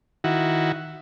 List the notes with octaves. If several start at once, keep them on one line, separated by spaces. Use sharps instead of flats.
D#3 E4 F#4